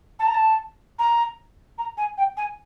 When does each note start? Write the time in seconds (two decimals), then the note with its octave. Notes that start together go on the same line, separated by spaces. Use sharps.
0.19 A5
0.27 A#5
0.34 A5
0.99 A#5
1.78 A#5
1.97 G#5
2.17 G5
2.37 G#5